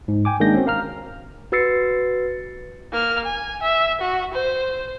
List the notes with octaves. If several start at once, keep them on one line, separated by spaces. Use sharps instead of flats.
G#2
G5 G#5 D6
D#3 G#3 A#3 D4 G6 A#6
C4 C#4 F#4
A#4 F5 A#5 F6
F#4 B4 E6 A6 C7 C#7
A#3 F6
G#5
E5
F#4
C5